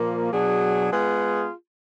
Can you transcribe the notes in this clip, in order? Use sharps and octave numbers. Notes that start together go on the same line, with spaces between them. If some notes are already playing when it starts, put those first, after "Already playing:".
Already playing: A#2 F3 A#3
B2 F#3 D4 G#4
G#3 B3 F4 G#4